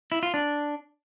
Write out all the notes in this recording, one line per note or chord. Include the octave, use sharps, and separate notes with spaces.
E4
F4
D4